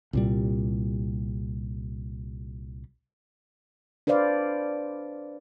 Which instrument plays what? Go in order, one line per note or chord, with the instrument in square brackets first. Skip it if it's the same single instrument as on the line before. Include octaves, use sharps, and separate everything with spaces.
[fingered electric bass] C2 A#2 G3
[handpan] D4 B4 C5 D5 F5